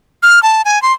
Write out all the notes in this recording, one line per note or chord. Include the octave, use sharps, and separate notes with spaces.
F6
A5
G#5
C6